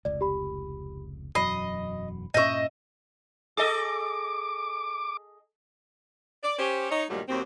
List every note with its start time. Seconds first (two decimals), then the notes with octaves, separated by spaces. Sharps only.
0.05 F1 C#2 D5
0.21 G4 B5
1.35 E1 F#2 F#3 D#5 B5 C7
2.34 G2 A#2 C#4 D#5 E5 C#6 G6
3.57 G#4 A4 D#5 D6
6.44 D5
6.59 C#4 G4 C5
6.91 D#4 C#5 D#5
7.09 G2 A#2 D#3 F#3 G3 A3
7.28 D#2 F#3 C4